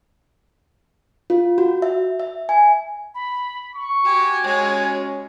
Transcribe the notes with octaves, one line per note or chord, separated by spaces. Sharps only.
F4
F#4
E5
E5
G#5
B5
C#6
F#4 G4 G#5
G#3 C#4 C#5